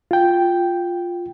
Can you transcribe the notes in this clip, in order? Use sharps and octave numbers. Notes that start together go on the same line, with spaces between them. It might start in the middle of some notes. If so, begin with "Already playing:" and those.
F4 G5